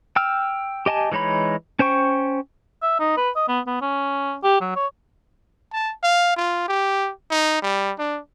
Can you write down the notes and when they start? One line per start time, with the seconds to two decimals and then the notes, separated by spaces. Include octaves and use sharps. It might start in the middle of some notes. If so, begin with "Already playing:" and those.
0.16 G5 E6 F6
0.86 G4 D#5 G#5 A5
1.12 E3 G#3 D#4 C#5 B5
1.79 C#4 C5 G5 C#6
2.82 E5
2.99 D#4
3.17 B4
3.36 D#5
3.48 B3
3.67 B3
3.82 C#4
4.44 G4
4.61 F#3
4.76 C#5
5.73 A5
6.03 F5
6.37 F4
6.68 G4
7.30 D#4
7.62 G3
7.99 D4